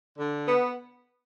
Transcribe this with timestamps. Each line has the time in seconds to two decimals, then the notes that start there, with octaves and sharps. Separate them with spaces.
0.18 D3
0.47 B3